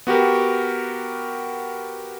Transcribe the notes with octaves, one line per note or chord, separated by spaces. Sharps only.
B3 F#4 G4 A#4